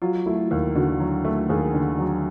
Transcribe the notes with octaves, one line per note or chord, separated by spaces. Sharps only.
F#3 F4
A3 E4
D#2
D3 F#4
F#3
A3
D#2 G#4
D3
F#3